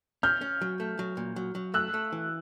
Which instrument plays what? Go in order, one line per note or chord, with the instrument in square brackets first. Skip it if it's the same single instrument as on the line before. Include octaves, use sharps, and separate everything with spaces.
[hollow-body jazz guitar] C#4 [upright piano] F6 G6
[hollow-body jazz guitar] C#4
F#3
A3
F#3
A#2
F#3
F#3
[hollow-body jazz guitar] A3 [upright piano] E6 F#6
[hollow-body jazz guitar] A3
E3